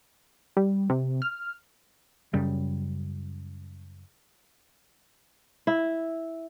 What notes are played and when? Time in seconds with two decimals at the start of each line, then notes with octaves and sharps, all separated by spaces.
0.57 G3
0.90 C3
1.22 F6
2.34 F#2 C#3 G3
5.67 E4